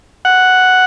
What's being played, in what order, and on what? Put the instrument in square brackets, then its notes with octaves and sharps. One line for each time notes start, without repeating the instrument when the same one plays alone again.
[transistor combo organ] F#5